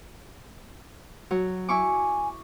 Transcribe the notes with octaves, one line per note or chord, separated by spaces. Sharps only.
F#3
E4 G#5 C#6 D6